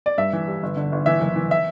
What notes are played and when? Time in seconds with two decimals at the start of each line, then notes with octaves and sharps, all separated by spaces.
0.06 D5
0.18 G2 E5
0.33 E3
0.48 G3
0.63 G1
0.77 D3
0.92 G1
1.06 E3 E5
1.21 F#1
1.36 E3
1.51 E5